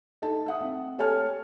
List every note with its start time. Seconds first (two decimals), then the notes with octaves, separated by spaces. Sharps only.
0.22 D#4 A4 A5
0.46 E5 F#5 D#6
0.61 C4
0.98 G4 A4 C#5 G#5 A5 F6